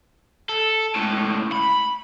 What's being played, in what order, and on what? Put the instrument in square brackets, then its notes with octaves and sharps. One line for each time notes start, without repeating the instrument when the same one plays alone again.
[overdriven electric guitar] A4
C#2 A2
B5